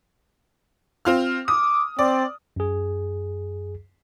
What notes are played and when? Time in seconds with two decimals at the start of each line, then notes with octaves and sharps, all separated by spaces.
1.05 C4 F4 F6
1.48 D6 D#6
1.99 C4 D5
2.56 F#2 G#4